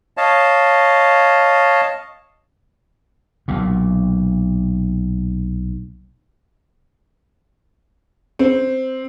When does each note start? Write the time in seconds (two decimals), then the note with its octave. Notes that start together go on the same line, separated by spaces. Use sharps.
0.17 C#5 D#5 F5 A5
3.48 B1 A#2
8.39 C4